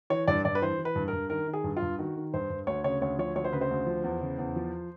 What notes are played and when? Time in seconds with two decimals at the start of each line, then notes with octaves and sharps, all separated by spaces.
0.10 E3 C#5
0.28 G2 D5
0.45 G2 D5
0.55 B4
0.62 E3 C5
0.79 E3
0.85 B4
0.96 G2
1.08 G2 A#4
1.30 D#3 A#4
1.48 D#3
1.53 G#4
1.64 G2
1.77 F4
1.82 G2
1.99 D#3 F#4
2.16 D#3
2.34 G2 C5
2.50 G2
2.67 D2 C#5
2.84 C#3 C#5
3.01 D2 C#5
3.18 F3 C#5
3.35 D2 C#5
3.44 C5
3.53 C#3 B4
3.61 C5
3.71 D2
3.87 F3
4.04 E2
4.21 C#3
4.38 E2
4.56 F3